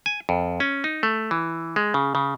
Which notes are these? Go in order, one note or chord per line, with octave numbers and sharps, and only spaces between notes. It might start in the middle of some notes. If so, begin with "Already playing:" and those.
G#5
F2
C#4
D#4
A3
E3
G#3
C#3
C#3